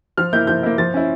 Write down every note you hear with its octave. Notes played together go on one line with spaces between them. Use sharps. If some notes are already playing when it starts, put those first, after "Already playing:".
F3 F6
A#3 E4 G6
F3 G6
A#3 E4
F3 A6
C#4 E4